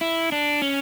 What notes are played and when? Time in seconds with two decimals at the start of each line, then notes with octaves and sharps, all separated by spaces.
0.01 E4
0.32 D4
0.62 C#4